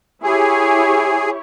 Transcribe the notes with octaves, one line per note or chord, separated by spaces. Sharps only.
E4 G4 G#4 C#5